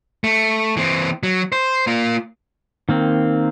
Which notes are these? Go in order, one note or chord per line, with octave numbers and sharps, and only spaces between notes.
A3
E3 C4
F#3
C5
A#3 F4
D#3 A#3 C4